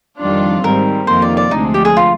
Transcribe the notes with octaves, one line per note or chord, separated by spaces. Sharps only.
F2 D#3 G3 D4 F4
G#2 D#3 G3 C4 A#4
F2 C3 D#3 A#3 F4 C5
D5
D5
D2 C3 F3 G#3 D4 D#4
G4
G#4
F4